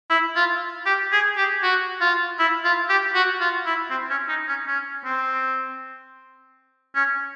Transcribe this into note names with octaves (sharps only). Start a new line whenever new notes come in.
E4
F4
G4
G#4
G4
F#4
F4
E4
F4
G4
F#4
F4
E4
C4
C#4
D#4
C#4
C#4
C4
C#4